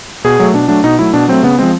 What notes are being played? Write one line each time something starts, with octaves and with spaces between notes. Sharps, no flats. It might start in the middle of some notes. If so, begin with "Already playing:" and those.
B2 G#4
F#3 A3
B2 D4
F#3 A3 D4
B2 D#4
F#3 A3 E4
B2 D4
F#3 A3 C4
C#3 B3
F3 G#3 C4